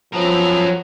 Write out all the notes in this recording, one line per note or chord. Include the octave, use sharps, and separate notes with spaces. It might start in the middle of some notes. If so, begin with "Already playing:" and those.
F3 F#3 B3 C4 A4 A#4